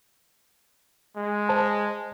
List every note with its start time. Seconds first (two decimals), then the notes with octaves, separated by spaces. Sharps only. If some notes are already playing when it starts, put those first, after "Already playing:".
1.16 G#3
1.49 C5 A5